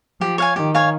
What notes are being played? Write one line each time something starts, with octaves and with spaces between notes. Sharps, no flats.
F3 G4
C#5 F5 G#5
D#3 G4
C#5 F5 G#5